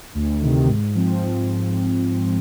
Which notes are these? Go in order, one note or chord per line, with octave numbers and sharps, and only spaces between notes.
D2
C3 D#3
G#2
F3 C4